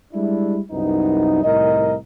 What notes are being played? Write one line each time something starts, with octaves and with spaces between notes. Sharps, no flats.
G3 G#3 D4 E4
C2 F#2 B3 D#4
C2 A2 D#3 A#4 D#5